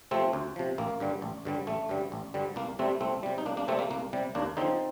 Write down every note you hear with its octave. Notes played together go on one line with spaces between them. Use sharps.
C3 F3 A3 C4
D2
C3 F3
A1 A#3
G2 D3 G3
A1
G2 D3 G3
A1 A3
G2 D3 G3
A1
G2 D3 G3
C2 A#3
C3 G3 A3 C4
C2 A3 C4
C3 G3
D#4
C2 A#3 D4
A#3 D4
C3 G3 A3 C4
A#3
C2 A#3
C3 G3
D#2 A#3 D4
D3 F3 C4 D#4